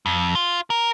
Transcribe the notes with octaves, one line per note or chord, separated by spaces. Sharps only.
F2
F4
A#4